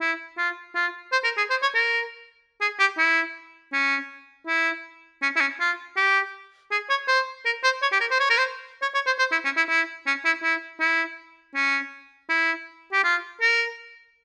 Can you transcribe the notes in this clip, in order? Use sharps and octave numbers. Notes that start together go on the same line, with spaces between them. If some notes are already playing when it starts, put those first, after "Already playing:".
E4
F4
F4
C5
A#4
G#4
C5
C#5
A#4
G#4
G4
E4
C#4
E4
C#4
E4
C#4
F4
G4
G#4
C#5
C5
A#4
C5
C#5
G4
A#4
C5
C#5
A#4
C5
C#5
C#5
C5
C5
E4
C#4
E4
E4
C#4
E4
E4
E4
C#4
E4
G4
F4
A#4